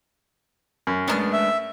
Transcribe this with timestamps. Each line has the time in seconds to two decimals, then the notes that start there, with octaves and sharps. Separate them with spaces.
0.87 F#2
1.08 G#3 A3 B3 D4 A5 F6
1.33 E5